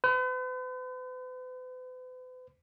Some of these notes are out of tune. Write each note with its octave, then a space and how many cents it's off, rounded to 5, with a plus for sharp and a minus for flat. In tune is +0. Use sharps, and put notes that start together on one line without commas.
B4 +45